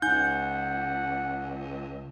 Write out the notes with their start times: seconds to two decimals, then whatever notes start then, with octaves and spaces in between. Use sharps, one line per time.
0.02 C#2 D#4 F#5 G#5 G6